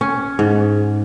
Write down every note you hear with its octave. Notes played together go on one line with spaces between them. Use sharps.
C#4
G#2